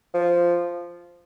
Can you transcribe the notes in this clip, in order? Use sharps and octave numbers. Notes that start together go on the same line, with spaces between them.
F3